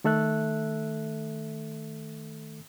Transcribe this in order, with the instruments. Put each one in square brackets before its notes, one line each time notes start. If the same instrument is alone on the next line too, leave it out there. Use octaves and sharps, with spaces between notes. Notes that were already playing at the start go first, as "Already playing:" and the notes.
[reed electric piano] D#3 A3 A4 E5 F#6